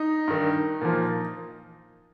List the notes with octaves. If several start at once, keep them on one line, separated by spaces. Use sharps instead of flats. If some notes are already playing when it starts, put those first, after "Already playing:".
Already playing: D#4
G2 D#3
A#2 F3